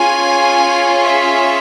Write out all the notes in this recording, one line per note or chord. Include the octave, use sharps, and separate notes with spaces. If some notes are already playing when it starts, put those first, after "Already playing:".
Already playing: C#4 F4 G#4 G#5
E5